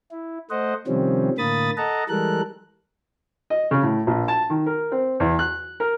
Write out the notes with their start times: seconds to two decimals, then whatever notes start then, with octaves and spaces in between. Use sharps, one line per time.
0.11 E4
0.50 A3 C5 D#5 F#5
0.87 C3 D#3 F3 G3 C4 C#4
1.38 A2 D3 A#3 B5 D#6 A6
1.77 A4 D#5 F#5 A5 A#5
2.09 E3 G3 G#3 A4 A#4 F#6
3.50 D#5
3.71 C#3
3.83 A2
4.07 A#1
4.28 A5
4.50 D#3
4.66 A#4
4.92 C4
5.20 E2
5.39 F#6
5.80 A#4